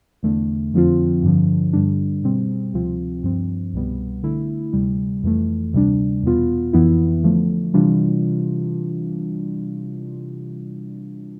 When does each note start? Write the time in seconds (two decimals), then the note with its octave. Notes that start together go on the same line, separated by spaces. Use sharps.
0.23 E2 D3 A3
0.73 F2 D3 F3 C4 F4
1.23 G2 D3 F3
1.73 G2 D3 G3 D4
2.23 B2 G3 C4
2.73 D2 C3 F3 C4 F4
3.24 G2 F3 C4
3.73 C2 B2 G3 B3
4.23 D3 A3 E4
4.73 D2 C3 G3
5.23 F2 E3 A3
5.73 D2 C3 G3 D4
6.23 E2 B2 B3 F4
6.73 F2 E3 B3 E4
7.23 D3 F3 A3
7.74 C3 E3 G3 D4 F4